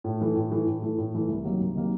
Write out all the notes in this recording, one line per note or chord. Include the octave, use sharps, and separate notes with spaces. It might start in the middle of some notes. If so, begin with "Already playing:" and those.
A2
E3 A3
A2
E3 A3
A2
E3 A3
A2
E3 A3
C2
C3 D#3 F#3 A#3
C2
C3 D#3 F#3 A#3